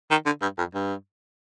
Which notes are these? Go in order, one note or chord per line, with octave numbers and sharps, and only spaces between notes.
D#3
D3
G2
F2
G2